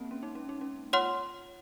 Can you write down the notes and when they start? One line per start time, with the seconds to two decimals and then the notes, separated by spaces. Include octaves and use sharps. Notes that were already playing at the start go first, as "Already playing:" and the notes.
Already playing: G#3 A#3 C4
0.11 C#4
0.23 D#4
0.35 C#4
0.49 D#4
0.61 C#4
0.93 F4 C#5 F#5 C6 F6